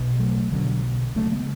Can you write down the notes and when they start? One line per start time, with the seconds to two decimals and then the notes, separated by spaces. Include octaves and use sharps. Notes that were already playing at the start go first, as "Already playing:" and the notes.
Already playing: B1 B2
0.19 F#3 A3
0.51 B1 B2 D3 F#3
1.16 D2 C#3 F#3 A3
1.31 G#3 B3